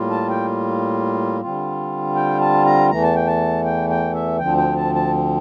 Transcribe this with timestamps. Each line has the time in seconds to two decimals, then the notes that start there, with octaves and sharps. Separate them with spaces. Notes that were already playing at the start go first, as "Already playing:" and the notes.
Already playing: A2 G3 A#3 F4
0.10 A5
0.30 G5
1.41 D3 G3 C4 F4
2.15 G5
2.40 A5
2.65 A#5
2.90 E2 E3 A3 A#5
3.03 A5
3.15 G5
3.27 A5
3.65 G5
3.90 G5
4.14 E5
4.39 D2 D3 F3 C4 G5
4.57 G5
4.76 A5
4.95 A5